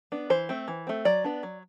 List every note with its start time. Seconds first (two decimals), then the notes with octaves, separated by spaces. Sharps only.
0.12 B3 D4
0.30 E3 C5
0.49 A3 C4
0.68 E3
0.87 A3 C4
1.05 F#3 D5
1.24 B3 D4
1.43 F#3